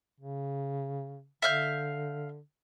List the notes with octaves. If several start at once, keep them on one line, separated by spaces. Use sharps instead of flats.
C#3
D3 E5 F5 G6